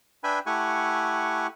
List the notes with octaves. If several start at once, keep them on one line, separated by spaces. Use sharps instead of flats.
D4 B4 E5 G5 G#5 B5
A3 E4 G4 F#5 G#5 C#6